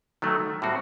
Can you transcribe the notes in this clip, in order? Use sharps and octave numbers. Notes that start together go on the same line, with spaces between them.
D#3 F#3 A3
A2 G3 C4 F#4